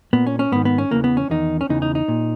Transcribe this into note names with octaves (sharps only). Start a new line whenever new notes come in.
A#2 B3
C#4
C#4
G#2 D#3 B3
B3
C#4
E2 C#3 E3 A#3
B3
C#4
E2 D#3 D#4
C#4
E2 C#3 E3 D#4
D#4
D#4
A#2